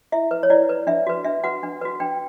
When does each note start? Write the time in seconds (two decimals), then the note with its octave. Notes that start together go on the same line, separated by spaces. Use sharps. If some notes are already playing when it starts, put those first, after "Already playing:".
0.12 E4 E5
0.31 B4
0.43 C#5
0.50 E4 D5
0.69 B4
0.87 D4 E5
1.07 F#4 B4
1.24 D4 E5
1.44 F#4 B4 F#5
1.63 D4
1.81 F#4 B4
2.00 D4 G5